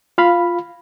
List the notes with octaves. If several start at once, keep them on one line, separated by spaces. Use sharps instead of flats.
F4 F5 B5